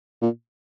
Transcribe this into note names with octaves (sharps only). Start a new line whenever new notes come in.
A#2